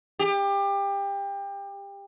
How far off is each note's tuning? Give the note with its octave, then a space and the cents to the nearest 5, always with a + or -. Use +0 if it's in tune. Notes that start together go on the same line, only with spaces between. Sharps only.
G4 +25